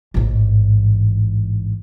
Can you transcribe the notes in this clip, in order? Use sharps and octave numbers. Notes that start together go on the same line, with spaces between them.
A1 G#2